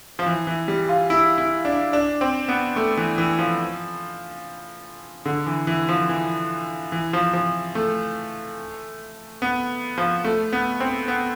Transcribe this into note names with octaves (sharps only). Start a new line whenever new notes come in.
F3
E3
E3
G3
F4
E4
E4
D4
D4
C4
B3
A3
E3
E3
F3
D3
E3
E3
F3
E3
E3
F3
F3
A3
B3
F3
A3
B3
C4
B3